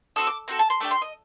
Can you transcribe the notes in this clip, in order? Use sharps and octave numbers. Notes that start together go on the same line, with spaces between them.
C4 F#4 A4 D#6
D6
C4 F#4 A4 A#5
A5
C6
A3 D4 G4 D6
C6
D#5